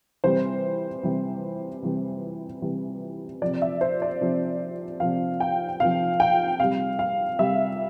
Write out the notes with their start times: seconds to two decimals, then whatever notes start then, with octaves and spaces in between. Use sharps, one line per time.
0.24 C3 E3 G3 C5
1.03 C3 E3 G3
1.82 C3 E3 G3
2.62 C3 E3 G3
3.42 C3 F3 D5
3.62 E5
3.81 C5
4.02 D5
4.21 C3 F3
5.00 C3 F3 F5
5.40 G5
5.80 C3 F3 F5
6.20 G5
6.60 C3 G3 F5
6.99 F5
7.39 C3 G3 E5